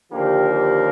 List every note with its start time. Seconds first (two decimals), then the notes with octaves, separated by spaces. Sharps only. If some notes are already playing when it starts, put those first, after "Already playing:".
0.11 D#2 D3 F3 A#3 G4
0.47 G4